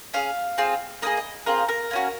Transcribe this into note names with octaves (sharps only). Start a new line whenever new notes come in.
C#4 G#4 F5
C4 F4 G#4
A#3 D#4 G#4 D#5
D#5
C4 F4 G#4 A#4
A#4
A#3 C#4 F#4